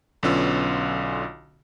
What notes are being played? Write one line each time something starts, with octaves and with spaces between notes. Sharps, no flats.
B1 D3 B3 C#4 F4 E6